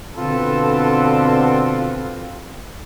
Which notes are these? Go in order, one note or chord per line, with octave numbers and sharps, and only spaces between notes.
B2 D3 C4 F4 A4 B4